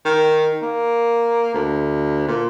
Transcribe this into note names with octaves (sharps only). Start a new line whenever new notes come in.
D#3
A#3
D2
A#2